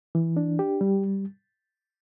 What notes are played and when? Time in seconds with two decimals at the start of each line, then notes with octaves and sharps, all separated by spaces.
0.15 E3
0.37 D4
0.59 G4
0.81 G3